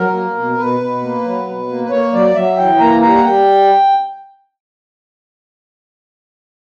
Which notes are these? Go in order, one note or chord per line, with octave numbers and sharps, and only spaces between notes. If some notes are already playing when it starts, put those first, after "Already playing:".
Already playing: F#3 A#4
A#3
B2
B2 B4
B2
A#3
F#3
B2
A#3
B4
A#3 C#5
F#3 D5
F#3 E5
E3 G5
A#3 A#5
G3 A#5
F#5
G3 G5